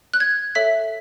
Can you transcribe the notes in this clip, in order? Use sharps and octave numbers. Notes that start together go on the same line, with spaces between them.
F#6
G#6
A4 C#5 E5 B6